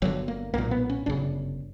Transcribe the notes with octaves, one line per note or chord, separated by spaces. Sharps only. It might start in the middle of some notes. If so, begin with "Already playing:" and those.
G1 G2 D3 F#3
A#3
B1 A#2 A#3
B3
C#4
G1 F#2 C#3 D4